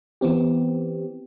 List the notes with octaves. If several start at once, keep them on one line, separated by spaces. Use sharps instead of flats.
E3 B3 C4 G4